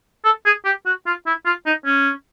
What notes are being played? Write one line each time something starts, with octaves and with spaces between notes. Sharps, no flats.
A4
G#4
G4
F#4
F4
E4
F4
D#4
C#4